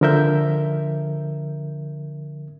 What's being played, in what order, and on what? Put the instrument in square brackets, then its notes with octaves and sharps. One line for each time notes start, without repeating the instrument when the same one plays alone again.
[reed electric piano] D3 F3 A#4 E5 G6